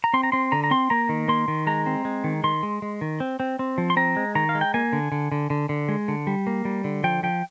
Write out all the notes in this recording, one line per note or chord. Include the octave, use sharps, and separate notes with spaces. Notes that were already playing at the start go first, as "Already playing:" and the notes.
A#5
C4 C6
A#5
C4 C6
D3 A#5
A#5
C4 C6
A#3 A#5
D#3
A#3 C6
D#3
G#3 A#5
C4
G#3
D#3
D#3 C6
G#3
G#3
D#3
C4
C4
C4
F3
C6
C4 A#5
G#3
D#3 A#5
F5
G#3
G5
A#3 G#5
D3
D3
D3
D3
D3
G#3
D3
G3
A#3
G3
D3
F3 G5
F3 G5